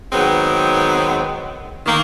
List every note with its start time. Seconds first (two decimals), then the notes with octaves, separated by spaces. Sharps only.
0.12 D#3 F#3 G#3 B3 C4
1.86 D#3 A#3